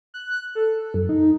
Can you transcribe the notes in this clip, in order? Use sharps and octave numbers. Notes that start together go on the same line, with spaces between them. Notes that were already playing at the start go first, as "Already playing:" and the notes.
F#6
A4
F#2
D#4